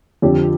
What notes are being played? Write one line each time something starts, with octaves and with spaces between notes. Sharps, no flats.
F2 D3 F3 G4